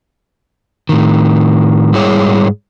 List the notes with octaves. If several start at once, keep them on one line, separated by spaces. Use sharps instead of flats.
A2 D#3
G#2 G3 E4 G#4 C#5